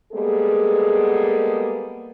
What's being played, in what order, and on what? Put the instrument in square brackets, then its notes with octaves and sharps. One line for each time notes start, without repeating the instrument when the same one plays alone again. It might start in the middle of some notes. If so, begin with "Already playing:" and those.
[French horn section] G3 G#3 A#3 B3 G#4 A4